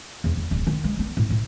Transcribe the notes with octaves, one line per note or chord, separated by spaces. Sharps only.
E2
E2
D1
D#3
G#3
B3
A2
A2